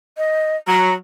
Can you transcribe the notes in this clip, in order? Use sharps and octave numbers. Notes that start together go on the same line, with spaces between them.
D#5
F#3 A#5